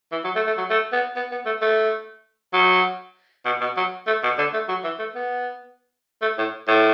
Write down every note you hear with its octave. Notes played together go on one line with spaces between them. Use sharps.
E3
F#3
A3
A3
F#3
A3
B3
B3
B3
A3
A3
F#3
B2
B2
F#3
A3
B2
D3
A3
F#3
E3
A3
B3
A3
A2
A2